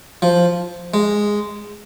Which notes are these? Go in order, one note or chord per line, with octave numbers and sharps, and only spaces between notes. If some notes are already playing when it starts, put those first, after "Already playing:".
F3
G#3